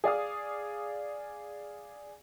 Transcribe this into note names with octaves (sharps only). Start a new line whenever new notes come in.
G#4 D5 F5 D#6